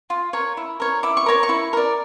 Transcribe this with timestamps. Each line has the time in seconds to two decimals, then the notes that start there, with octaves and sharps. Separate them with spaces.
0.10 F4
0.33 A#4 C#5
0.57 E4
0.80 A#4 C#5
1.03 E4 D6
1.17 C#6
1.26 A#4 C#5 A#5
1.43 C#6
1.49 E4
1.73 A#4 D5